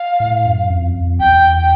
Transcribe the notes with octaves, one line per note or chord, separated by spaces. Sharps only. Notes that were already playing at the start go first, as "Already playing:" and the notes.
Already playing: F5
A2
F#2
F2
F2
E2 G5
G5